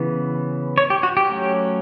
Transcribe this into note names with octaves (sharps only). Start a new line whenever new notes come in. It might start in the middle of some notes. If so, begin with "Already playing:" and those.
Already playing: C#3 E3 B3
C#5
G4
F#4
G4
F#3 A3 C#4